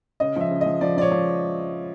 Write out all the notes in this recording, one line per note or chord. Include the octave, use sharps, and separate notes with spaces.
C#3 D#5
F3 E5
C#3
D#5
F3
F3 D5
F3 C#5 D5
F3